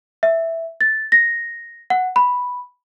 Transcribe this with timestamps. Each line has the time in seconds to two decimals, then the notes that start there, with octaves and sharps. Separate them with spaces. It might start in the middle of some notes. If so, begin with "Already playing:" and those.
0.23 E5
0.81 A6
1.12 A#6
1.90 F#5
2.16 B5